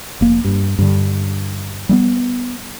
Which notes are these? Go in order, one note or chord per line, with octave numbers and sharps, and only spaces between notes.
F1 A#3
G2
G2 D3
G3 G#3 B3